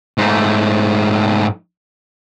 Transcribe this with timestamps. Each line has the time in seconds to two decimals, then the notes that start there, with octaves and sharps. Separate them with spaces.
0.18 G#2 A3